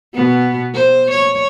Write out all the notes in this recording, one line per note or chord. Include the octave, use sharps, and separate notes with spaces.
B2 B3
C5
C#5